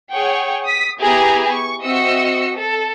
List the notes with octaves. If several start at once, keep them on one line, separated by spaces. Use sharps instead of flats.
G#4 C#5 F#5 G5 C#6
D#6 B6
B3 E4 G4 G#4 G#5 A#5
C#6
C4 F#4 D#5 E5 E6 C#7
A4